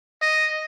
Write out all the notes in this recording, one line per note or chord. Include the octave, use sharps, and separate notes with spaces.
D#5